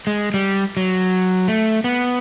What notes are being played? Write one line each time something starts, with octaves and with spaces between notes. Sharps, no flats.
G#3
G3
F#3
A3
B3